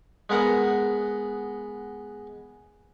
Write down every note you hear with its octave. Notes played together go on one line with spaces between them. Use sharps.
G#3 B3 A#4 F#5